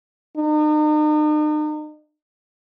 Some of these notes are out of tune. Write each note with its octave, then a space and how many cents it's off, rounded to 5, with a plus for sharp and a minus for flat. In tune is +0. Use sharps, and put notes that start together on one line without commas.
D#4 -40